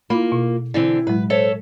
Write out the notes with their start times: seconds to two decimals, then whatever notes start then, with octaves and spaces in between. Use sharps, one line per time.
0.10 A#3 E4 F4 B5
0.32 B2
0.74 D3 E3 C4 E4
1.07 A2 F#3 G#3 B4
1.30 A4 C5 C#5 E5